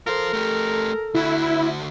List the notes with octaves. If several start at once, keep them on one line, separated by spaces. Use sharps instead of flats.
F4 A4 A#4 C5
A3 G4
D2 E4 F#4